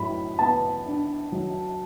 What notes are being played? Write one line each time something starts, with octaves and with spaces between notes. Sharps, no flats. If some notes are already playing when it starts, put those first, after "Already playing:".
Already playing: A2 F#3 B5
B3 A5
D4
F#3